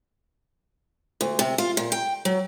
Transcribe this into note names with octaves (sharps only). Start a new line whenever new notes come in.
D2
C3
F4
A#2
G5
F#3